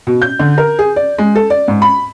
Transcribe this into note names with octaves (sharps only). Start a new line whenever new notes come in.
B2
G6
D3
A#4
G#4
D5
G#3
A4
D5
G#2
B5